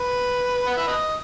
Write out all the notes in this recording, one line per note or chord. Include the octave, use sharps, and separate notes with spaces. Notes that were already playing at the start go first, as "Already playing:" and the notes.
Already playing: B4
F#5
E5
B4 D#5